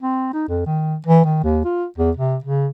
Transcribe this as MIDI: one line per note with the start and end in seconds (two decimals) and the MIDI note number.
0.01 0.32 60
0.33 0.48 63
0.49 0.65 41
0.66 0.96 51
1.07 1.24 52
1.25 1.42 51
1.43 1.60 39
1.65 1.85 65
1.98 2.11 40
2.17 2.37 48
2.44 2.67 49